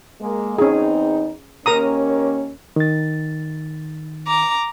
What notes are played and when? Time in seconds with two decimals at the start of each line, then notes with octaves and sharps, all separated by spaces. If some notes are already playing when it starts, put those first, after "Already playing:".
0.21 G#3 A#3
0.58 E2 C4 C#4 D#4 G#4
1.66 D#2 A#3 C#4 A#4 A#5 D#6
2.76 D#3 A6
4.27 A#5 D6